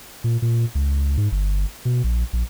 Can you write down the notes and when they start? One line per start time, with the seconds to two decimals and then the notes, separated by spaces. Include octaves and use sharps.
0.24 A#2
0.42 A#2
0.75 C#2
1.17 G#2
1.32 G1
1.85 B2
2.04 A#1
2.33 A#1